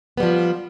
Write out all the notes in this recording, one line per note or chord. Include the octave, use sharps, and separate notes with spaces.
F3 G3 B3